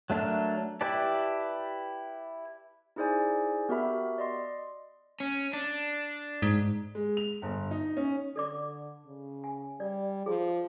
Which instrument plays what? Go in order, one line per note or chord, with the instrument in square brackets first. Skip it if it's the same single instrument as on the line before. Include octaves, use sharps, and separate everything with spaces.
[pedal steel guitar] F#3 A3 D4 A4 A#4
E4 G4 B4 D5 A5
[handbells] D#4 E4 G#4 C5 D5 G#5
B3 F#4 G4 A#4 E5 B5
D5 D#5 C6
[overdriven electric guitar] C#4
D4
[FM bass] G#2
[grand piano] G#3
F7
G1
D#4
C#4
[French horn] D3 [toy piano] A4 D5 D6
[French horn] C#3
[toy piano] G#5
[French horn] G3 [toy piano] D5
[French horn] F3 [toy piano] G#4